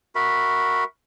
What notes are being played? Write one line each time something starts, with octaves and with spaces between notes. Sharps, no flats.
F#4 A#4 E5 B5